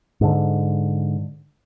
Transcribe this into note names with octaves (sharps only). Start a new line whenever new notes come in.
G#2 D3